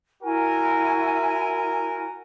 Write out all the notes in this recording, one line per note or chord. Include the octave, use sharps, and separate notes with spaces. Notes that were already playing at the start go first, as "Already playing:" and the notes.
E4 F#4 A#4 G#5